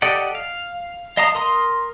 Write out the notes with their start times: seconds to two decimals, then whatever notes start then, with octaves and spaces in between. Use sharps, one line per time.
0.02 G4 A4 D5 D#5 F#5
0.35 F5
1.17 D#5 F5 A5 A#5 D#6
1.35 A#4 C6 D#6